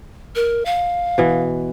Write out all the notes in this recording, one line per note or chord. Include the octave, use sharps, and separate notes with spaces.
A#4
F5
B2 E3